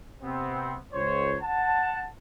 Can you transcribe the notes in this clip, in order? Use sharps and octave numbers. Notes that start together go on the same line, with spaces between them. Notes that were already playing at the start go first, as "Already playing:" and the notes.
C3 B3 C4
C#2 C5 C#5
F#5 A5